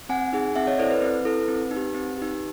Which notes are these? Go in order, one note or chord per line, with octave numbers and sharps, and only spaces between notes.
C4 F#5 G#5
D#4 G#4
C4 E5 F#5
C#5 D#5
E4 A4 C5 D5
B4
C4 B4
E4 A4
C4
D#4
G4
C4
D#4 G4